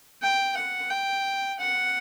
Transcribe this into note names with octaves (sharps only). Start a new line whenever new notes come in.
G5
F#5
G5
F#5